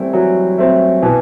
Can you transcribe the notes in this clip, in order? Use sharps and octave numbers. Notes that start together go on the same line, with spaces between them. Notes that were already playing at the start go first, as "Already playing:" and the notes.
Already playing: E3 G3 A3 C4 E4
E3 F#3
A3 C4 E4
B2 E3